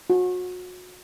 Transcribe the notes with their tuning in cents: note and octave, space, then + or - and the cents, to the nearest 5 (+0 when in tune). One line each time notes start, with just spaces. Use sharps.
F#4 -30